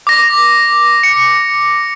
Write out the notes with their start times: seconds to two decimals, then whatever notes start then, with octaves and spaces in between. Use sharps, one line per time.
0.07 D6 A#6
1.03 C#7